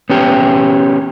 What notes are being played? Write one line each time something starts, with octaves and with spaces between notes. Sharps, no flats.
B3 C#4 G4